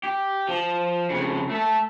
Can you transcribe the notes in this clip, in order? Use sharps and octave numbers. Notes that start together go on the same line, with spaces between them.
G4
F3
F2 C#3
A3 A4